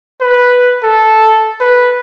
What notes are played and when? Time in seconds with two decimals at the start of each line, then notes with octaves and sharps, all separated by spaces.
0.21 B4
0.84 A4
1.61 B4